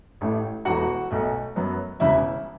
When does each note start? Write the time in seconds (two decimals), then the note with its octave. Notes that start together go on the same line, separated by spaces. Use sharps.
0.21 A1 A2 A3
0.65 E1 E2 E3 A3 F#4 F#5
1.11 B1 B2 A3
1.56 F#2 F#3 B3
2.00 E1 E2 C#3 E3 E4 E5